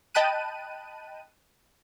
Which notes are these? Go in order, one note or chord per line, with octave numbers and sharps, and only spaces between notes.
D#5 G5 A5 B5 F#6 D#7